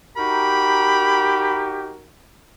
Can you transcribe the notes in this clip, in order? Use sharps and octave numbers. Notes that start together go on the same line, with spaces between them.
D#4 F#4 G4 A#4 B5